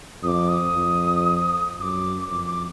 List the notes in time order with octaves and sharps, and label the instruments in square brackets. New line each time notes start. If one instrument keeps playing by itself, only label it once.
[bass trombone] F2 [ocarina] D#6
[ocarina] D6
D#6
[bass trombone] F2
[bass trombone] F#2 [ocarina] D6 D#6
[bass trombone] F2 [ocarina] D6
[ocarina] D6